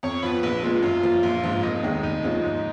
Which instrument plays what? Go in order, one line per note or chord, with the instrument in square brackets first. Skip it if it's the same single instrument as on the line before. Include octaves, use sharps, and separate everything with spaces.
[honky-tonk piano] F2 [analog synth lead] C#5
[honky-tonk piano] F3 B3 [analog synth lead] B4
[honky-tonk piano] A#1 [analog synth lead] B4
[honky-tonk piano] A#2 G#3 [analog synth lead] F4
[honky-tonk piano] F#2 [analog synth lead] F4
[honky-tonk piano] F3 A#3
A#1
G#2 F3
[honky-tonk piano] F1 [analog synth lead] D#4
[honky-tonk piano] D#2 D#3 G#3
[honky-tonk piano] F1 [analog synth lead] D#4
[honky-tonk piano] D#2 C#3 F3 G#3
G#2